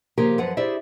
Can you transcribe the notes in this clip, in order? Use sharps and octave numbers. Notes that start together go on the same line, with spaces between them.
C#3 F3 A#3 G4 G#4 A#4
F#2 F3 B4 D5 F#5
E4 G4 G#4 C5 D5 E5